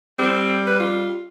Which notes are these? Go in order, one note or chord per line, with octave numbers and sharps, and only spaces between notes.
G3 C4
B4
F4